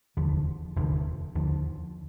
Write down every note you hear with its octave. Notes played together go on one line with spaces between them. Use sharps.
F1 D#2 D3 F3
F1 D#2 D3 F3
D#2 D3 F3